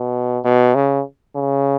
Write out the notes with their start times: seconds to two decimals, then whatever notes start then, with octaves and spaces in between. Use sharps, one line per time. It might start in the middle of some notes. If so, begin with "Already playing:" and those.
Already playing: B2
0.45 B2
0.75 C#3
1.36 C#3